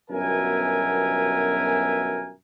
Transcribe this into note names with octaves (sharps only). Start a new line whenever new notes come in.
G1 F#2 B2 A#4 E5 G#5